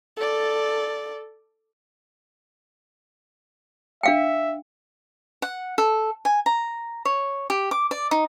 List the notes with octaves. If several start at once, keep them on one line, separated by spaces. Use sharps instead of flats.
A4 D5
D4 E5 F5 G5
F#5
A4
G#5
A#5
C#5
G4
D6
D5
D#4